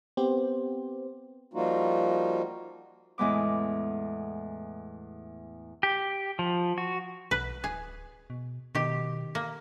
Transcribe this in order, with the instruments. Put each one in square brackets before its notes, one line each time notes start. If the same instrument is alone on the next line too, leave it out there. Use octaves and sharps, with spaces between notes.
[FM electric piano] B3 C4 G4 C5
[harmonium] F3 G3 A#3 D#4 F4 F#4
[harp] E2 A2 G#3 B3 D6
[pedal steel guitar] G4
F3
F#4
[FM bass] B1 [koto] B4
[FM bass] D1 [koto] G#4
[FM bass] B2
[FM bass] B2 [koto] D#3 G4
[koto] A#3